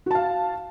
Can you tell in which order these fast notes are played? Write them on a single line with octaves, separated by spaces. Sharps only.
F#4 A5 F5